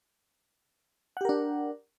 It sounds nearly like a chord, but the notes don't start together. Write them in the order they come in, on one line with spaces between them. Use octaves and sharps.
F#5 G4 A#4 D4